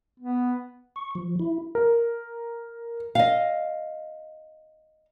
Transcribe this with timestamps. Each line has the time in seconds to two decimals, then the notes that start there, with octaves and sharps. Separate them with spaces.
0.20 B3
0.96 C#6
1.15 F3
1.39 E4
1.75 A#4
3.15 D#5 F5